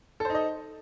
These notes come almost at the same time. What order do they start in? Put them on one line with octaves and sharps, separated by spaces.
A4 C5 D#4 D#5